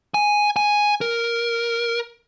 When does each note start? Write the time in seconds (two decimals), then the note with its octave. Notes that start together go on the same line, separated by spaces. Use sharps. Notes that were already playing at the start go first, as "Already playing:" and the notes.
0.14 G#5
0.56 G#5
1.01 A#4